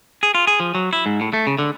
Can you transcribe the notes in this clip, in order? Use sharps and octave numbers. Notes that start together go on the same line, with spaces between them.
G#4
F4
G#4
F3
F#3
E4
G#2
A2
A3
C#3
D3